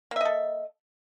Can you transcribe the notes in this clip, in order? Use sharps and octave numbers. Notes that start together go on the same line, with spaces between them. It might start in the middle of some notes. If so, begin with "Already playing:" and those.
A#3 A4 D#5 E5